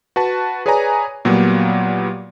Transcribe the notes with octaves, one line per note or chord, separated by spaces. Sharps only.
F#4 B4 A5
G#4 B4 C#5 D5 G#5 A#5
A#2 F#3 G3 A#3 B3